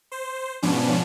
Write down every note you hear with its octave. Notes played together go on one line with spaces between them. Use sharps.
C5
G#2 B2 F3 B3 C#4 D4